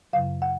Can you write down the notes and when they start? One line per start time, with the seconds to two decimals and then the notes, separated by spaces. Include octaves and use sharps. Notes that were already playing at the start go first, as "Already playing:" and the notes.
0.13 F#2 C#3 F#3 F5
0.42 F#5